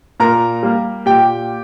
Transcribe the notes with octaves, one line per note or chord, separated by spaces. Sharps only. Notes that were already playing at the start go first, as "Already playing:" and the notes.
A#2 A#4 A#5
G3 A#3
A#2 G4 G5